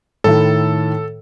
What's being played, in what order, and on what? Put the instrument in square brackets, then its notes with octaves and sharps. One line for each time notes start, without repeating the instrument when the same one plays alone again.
[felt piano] A2 D#3 E4 [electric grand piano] A4